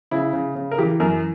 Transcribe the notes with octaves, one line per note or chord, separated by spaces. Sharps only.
C#3 E4
C#3
C#3
A#4
E3 G4
F#2 A#4